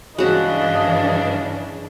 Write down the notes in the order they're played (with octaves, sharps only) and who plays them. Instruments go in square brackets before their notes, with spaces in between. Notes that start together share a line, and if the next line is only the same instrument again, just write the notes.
[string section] G2 E3 D4 [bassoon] C#3 [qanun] G#3 F#4 [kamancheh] D#5 F5